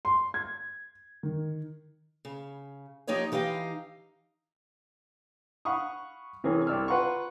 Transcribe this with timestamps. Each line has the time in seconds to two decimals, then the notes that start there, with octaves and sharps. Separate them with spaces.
0.05 C6
0.34 G#6
1.23 D#3
2.25 C#3
3.07 F3 A#3 D#4 G4 C#5 D#5
3.32 E3 D#4 G4 F5
5.65 F5 F#5 B5 C#6 D#6
6.44 C3 E3 C#4 G#4 A#4
6.67 C2 D5 E6 F6
6.88 F4 B4 F#5 A#5 C6 C#6